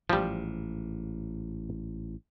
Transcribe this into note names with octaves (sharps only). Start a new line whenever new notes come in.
A1 G#2 F3 G3